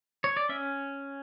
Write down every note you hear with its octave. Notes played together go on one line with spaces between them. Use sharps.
C#5
D5
C#4 E5